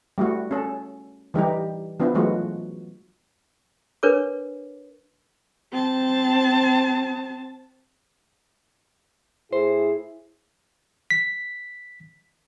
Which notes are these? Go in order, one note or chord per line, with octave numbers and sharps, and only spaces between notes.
G3 A3 E4 F#4
C#4 A4
E3 G3 D#4 G4
F3 B3 D4 E4
E3 F#3 G#3 A3 F4 F#4
D4 A#4 B4 C#5 D6
C4 A5
A2 E4 G#4 C5
B6